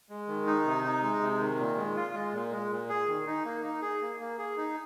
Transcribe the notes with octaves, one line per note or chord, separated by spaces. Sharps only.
G#3
D#3
D#4
C3
D#4
G#3
C3
D#3
A#2
G#3
F4
G#3
A#2
G#3
A#2
G#4
D#3
D#4
A#3
D#4
G#4
A#3
A#3
G#4
D#4